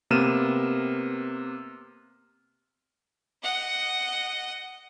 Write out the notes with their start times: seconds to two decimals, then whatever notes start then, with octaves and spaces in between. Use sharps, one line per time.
0.11 C3 A#3 B3 F6 D#7 E7
3.43 D#5 F#5